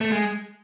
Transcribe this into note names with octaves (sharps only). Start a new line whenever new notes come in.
A3
G#3